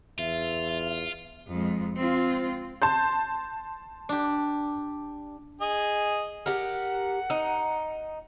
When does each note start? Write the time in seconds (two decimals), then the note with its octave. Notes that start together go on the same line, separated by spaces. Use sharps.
0.19 E2 F4 E5
1.48 F2 G#3
1.96 C4 F4
2.82 A5 C6 G6
4.09 D4 G4
5.61 G#4 D#5
6.46 G4 A#4 F#5
7.30 D#4